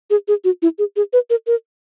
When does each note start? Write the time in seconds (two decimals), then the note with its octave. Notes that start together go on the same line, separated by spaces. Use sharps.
0.10 G#4
0.28 G#4
0.44 F#4
0.62 E4
0.79 G#4
0.96 G#4
1.13 B4
1.30 A#4
1.47 A#4